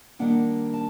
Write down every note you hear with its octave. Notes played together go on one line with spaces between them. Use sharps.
D#3 G3 A#3 D4 F#5
A5